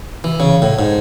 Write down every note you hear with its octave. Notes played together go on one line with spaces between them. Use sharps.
E3
C#3
A2
G#2